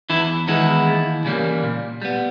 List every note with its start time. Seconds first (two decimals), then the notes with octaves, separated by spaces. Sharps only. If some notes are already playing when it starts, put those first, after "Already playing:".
0.10 E2 E3 E4
0.48 D#3 E3 G#3 B3 E4
0.87 D#2
1.25 C#3 E3 G3 A#3
1.63 A#2
2.02 G3 B3